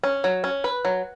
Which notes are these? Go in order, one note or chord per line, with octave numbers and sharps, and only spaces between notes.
C#4
F#3
C#4
B4
F#3